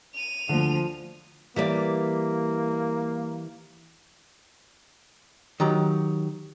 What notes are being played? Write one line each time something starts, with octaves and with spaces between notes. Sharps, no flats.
D#7 F7
D2 D3 F3
E3 G3 A#3 D5
D#3 F#3 G4 A#5